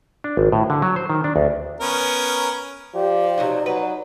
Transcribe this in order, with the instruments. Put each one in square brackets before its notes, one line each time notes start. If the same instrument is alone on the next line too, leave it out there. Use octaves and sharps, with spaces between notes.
[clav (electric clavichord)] D4
G#1
A2
D3
F#3
C5
D#3
D4
D2
[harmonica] B3 C#4 A#4
[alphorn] F3 [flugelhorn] G4 [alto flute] D5
[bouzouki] C3 F#3 F#4 [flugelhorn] D#4
[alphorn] F#3 [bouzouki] B4